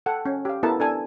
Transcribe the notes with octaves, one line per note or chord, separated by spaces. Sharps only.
A4 F#5 G5
C#4
G4 F5
B3 E4 A4 A#4 A5
D4 A4 G#5